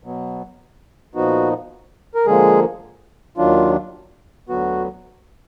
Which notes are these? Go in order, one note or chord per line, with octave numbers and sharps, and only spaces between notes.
B2 F#3 B3
A#2 F3 B3 D#4 F#4
A#4
D3 F3 G#3 A#3 G#4
D#2 D#3 F#3 D4 F4
D2 D3 F#3 B3 F#4